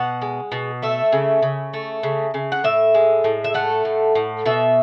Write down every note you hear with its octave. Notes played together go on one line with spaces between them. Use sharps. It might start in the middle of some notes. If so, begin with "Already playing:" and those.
Already playing: B2 F#5
G#3
B2
A3 E5
C#3
C#3
A3
C#3
C#3
F#5
A2 E5
G#3
A2
E5
A3 F#5
A2
A2
B2 E5